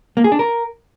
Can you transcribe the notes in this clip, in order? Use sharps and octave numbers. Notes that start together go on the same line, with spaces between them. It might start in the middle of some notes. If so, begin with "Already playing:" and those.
A#3
G#4
D4
A#4